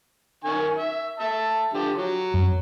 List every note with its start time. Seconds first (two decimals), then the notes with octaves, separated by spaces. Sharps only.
0.44 D#3 G#5 C#6
0.78 E5
1.20 E5 A5
1.73 D3 F3 G4
1.97 F#3
2.34 F#2